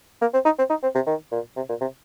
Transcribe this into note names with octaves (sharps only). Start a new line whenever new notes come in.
A#3
C4
D#4
C4
D#4
C4
C3
D#3
A#2
C3
A#2
C3